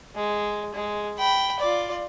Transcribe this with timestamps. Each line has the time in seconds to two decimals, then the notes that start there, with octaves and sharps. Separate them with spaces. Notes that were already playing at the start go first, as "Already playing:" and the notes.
0.15 G#3
0.74 G#3
1.18 G5 B5
1.60 F4 D5